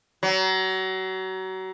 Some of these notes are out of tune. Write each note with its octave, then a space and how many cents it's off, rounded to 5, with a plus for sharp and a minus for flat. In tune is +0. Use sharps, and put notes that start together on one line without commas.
F#3 +30